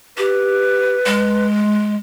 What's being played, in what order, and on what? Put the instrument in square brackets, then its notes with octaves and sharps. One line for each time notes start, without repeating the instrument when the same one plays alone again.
[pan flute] G4 [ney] B4
[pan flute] G#3